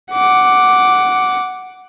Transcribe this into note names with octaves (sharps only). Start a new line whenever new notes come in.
F#5 D6